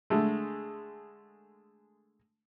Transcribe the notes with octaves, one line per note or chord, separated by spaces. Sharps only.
D3 G#3 A3